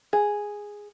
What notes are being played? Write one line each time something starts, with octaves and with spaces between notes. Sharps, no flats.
G#4